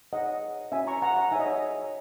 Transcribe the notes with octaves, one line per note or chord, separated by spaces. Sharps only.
D#4 G#4 C#5 D#5 F#5
C#4 F#4 C#5 E5 G#5
A#5 C#6
F#5 A#5
F#5 A#5
D#4 G#4 C#5 E5 G#5
D#5
C#5 E5